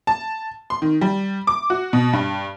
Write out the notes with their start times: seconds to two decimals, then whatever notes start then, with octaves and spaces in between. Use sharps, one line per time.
0.07 A5
0.70 C6
0.82 D#3
1.01 G3
1.47 D6
1.70 F#4
1.93 B2
2.13 G2